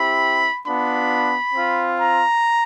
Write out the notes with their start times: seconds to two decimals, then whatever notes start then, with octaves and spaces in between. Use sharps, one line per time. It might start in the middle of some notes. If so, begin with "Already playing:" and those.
Already playing: C4 E4 G4 B5
0.66 B3 D4 F4 B5
1.54 C4 F4
1.99 A#5